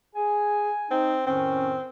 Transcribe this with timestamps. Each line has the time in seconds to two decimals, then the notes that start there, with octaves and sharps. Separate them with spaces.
0.16 G#4 G#5
0.91 C4 D#4
1.27 F2 A2 D#3 C4 C#4